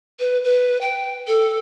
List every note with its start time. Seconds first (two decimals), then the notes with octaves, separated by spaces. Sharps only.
0.20 B4
0.44 B4
0.81 G5
1.27 A4